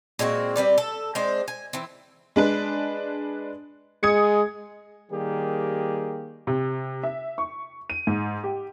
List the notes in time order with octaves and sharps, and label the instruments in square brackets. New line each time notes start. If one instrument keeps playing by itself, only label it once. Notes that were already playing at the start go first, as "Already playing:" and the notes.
[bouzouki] A#2 G#3 C4 F#4
G3 C4 B4 D5
A4
G#3 C4 D4 C5
G#5
E3 C4
[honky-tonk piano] G#3 D4 B4
[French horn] G#3 [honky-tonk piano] D#6 G#6 C#7
[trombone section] D#3 G3 A#3 G4 G#4
[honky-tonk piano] C3
E5
C#6
D#7
G#2
G4